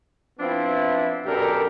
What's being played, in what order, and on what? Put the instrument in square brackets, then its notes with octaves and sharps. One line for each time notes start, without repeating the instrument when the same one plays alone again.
[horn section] F3 B3 C4 D4 E4
F#2 B2 D4 G4 A4 A#4